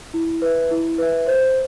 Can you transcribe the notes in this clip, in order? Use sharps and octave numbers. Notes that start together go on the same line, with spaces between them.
E4
B4 E5
E4
B4 E5
C5